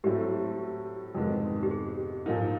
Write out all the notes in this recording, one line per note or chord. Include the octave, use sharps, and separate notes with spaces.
A2 F#3 A3 C4 G4
G4
F2 C3 D#3 G#3 B3
G4
G#4
A#2 F3 A#3 D#4